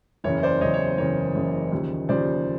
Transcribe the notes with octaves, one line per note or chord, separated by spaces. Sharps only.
F#1 E2 C#3 C#5
C5 D5
F#1 E2 C#3 C#5 D#5
C#5
C5
F#1 E2 C#3 C#5
F#1 E2 C#3
D#2 C#3 F3
D#2 C#3 F3 C5 D5